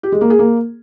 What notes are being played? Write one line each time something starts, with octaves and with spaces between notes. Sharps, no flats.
G4
G#3
A#3
G#4
A#3